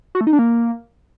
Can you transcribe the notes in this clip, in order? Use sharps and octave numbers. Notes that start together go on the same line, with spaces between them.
F#4
A3
D#4
D4
A#3